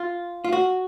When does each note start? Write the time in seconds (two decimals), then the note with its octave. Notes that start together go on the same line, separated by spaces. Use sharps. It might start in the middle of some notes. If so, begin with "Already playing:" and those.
Already playing: F4
0.45 F4
0.53 F#4